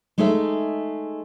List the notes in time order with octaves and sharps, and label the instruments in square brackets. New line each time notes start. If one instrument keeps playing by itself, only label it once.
[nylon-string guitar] G#3 A3 D#4 G#4 E5